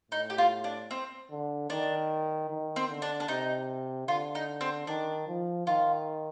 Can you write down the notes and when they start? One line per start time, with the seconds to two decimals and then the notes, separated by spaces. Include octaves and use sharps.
0.11 A2 D#4
0.30 G4
0.38 F4
0.64 D4
0.91 C4
1.31 D3
1.70 D#3 D4
2.50 D#3
2.76 C4
2.89 D3
3.02 D4
3.20 D4
3.28 C3 D#4
4.08 D3 F4
4.35 D#4
4.61 C4
4.87 D#3 D4
5.28 F3
5.67 D#3 F4